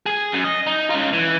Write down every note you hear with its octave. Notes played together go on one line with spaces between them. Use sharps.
G#4 G#5
F#2
D#5
D#4
C#4 F4
E3